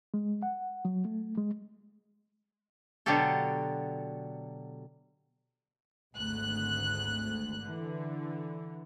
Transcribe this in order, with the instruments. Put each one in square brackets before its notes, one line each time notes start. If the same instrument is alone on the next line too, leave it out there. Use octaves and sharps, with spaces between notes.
[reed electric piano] G#3
F#5
F#3
A3
G#3
[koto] B2 D3 F#3 F#4 G4 A4
[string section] G#1 D2 F#6
D3 E3